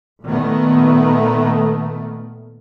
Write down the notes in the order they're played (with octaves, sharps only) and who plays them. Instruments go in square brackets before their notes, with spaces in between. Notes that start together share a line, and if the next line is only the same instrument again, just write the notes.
[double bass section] A#2 D#3 A3 B3